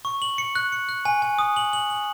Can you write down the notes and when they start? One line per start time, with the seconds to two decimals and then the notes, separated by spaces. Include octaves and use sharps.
0.05 C#6
0.22 F#7
0.38 C#7
0.55 F#6
0.72 C#7
0.89 F#6
1.05 G#5
1.22 G#5
1.39 D#6
1.57 F#7
1.73 F#7
1.90 F#7